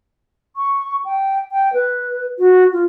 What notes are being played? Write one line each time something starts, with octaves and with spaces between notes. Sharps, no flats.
C#6
G5
G5
B4
F#4
F4